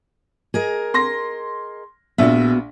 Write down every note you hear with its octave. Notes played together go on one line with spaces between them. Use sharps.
G#4 A#4 D#5
C6 A#6
A#1 B3 F4 F#4 E5